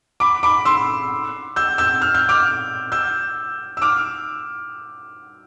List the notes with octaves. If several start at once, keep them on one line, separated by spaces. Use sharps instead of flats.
B5 D6
B5 D6
C6 E6
E6 G6
E6 G6
F6
G6
D6 F6
E6 G6
E6
D6 F6